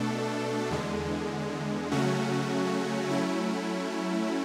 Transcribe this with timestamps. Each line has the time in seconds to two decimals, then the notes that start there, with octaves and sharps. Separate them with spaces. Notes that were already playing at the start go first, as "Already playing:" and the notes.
Already playing: B2 A3 D4 A4
0.71 E2 D3 G#3
1.91 C#3 F#3 A3 C#4 F#4
3.10 F#3 A3 C#4 E4